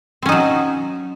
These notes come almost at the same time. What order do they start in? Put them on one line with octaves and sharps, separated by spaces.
C4 C#4 D#4 F#3